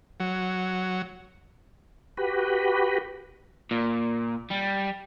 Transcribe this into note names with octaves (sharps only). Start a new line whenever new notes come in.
F#3
F#4 G4 B4
A#2
G3